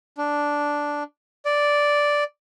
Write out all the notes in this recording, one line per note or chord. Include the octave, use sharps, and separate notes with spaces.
D4
D5